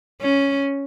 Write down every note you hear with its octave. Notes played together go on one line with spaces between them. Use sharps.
C#4